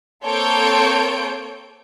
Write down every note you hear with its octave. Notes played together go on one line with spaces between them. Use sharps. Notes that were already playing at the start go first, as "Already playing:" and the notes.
A#3 C4 A4 C#5 G6 D7